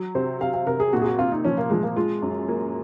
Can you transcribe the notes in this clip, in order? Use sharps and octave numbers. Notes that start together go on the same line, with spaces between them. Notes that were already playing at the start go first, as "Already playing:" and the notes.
Already playing: F#3
C3 C5
C3 F5
F5
C3 A#4
G#4
A#2 F#4
G#4
F#4
C4 F4
D#4
F3 C#4
A#3
F3 G#3
A#3
G#3 F4
F#2
A#3